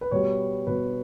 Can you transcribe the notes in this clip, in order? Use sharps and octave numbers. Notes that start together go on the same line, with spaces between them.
B4
B2 G3 B3 C#5
B2 G3 B3 B4